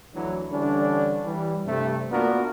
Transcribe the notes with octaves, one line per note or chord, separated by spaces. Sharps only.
D2 E3 F#3
D3 E3 G3 C#4 D4
E3 G3
G2 C3 A3
A#3 B3 D4 F4 F#4 A#4